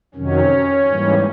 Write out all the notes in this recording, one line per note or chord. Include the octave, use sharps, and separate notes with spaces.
F2 C3 D#3 F#3 C#4
G#2 E3 G3 A#3